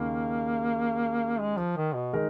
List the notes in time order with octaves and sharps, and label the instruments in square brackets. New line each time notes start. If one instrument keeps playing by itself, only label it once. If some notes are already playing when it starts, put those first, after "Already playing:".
Already playing: [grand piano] D#2 C#3 [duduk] A#3
[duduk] G#3
F3
D#3
B2
[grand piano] D#3 G#3 D#4 A#4